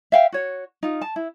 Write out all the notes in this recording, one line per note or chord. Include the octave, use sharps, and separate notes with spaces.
E5 F5 G5
F#4 C#5
D#4 F4
A5
E4